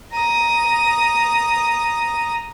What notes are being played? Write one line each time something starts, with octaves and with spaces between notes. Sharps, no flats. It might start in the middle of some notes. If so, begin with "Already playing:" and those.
A#5 D#6